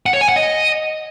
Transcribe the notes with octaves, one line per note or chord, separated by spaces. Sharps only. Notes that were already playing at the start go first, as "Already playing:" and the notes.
F#5
C#5
G#5
F#5
D#5